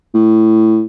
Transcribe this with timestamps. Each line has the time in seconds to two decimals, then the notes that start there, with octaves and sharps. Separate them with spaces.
0.14 A2